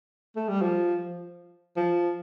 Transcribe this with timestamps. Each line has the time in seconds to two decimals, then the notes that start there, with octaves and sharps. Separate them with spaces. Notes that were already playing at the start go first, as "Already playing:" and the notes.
0.36 A3
0.49 G3
0.62 F3
1.77 F3